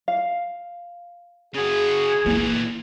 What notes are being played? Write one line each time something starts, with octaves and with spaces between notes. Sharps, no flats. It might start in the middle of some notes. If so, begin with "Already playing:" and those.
F5
C#3 F#4 G#4
A#2 E3 A#3 E4